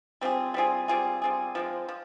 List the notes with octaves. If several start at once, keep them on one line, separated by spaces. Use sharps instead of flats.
G3 C4 F4 G#4
G3 C4 F4 G#4
G3 C4 F4 G#4
G3 C4 F4 G#4
F3 G#3 C4
F3